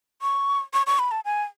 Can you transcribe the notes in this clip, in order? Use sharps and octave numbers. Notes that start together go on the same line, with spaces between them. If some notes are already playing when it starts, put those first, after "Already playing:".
C#6
C#6
C#6
B5
A5
G#5